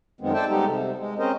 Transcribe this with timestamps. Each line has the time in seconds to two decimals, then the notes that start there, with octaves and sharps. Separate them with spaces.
0.21 F#2 D#3 G#3 B3 C4
0.34 A4 C5 D5 E5 G5 A5
0.49 G3 G#3 B3 D#4 G4 A4
0.65 C3
0.98 G#3
1.19 C4 C#4 A#4 C5 D#5